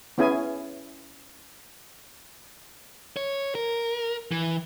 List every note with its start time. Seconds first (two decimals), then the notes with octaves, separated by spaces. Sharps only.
0.18 B3 C#4 E4 G#4 G#5
3.17 C#5
3.55 A#4
4.32 E3